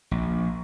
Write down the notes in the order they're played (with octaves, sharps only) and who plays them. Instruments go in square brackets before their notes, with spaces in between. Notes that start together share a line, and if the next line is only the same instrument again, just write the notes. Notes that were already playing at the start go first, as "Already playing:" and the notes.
[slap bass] A#1